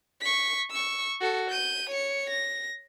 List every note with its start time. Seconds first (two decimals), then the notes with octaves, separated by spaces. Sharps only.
0.21 C#6 B6
0.71 C#6 E6
1.21 F#4 A4
1.50 G6 D#7
1.90 C#5 C#7
2.30 A#6